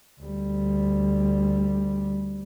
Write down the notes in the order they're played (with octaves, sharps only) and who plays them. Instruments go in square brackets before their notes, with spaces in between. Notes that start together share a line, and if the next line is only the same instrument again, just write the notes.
[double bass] D2 G3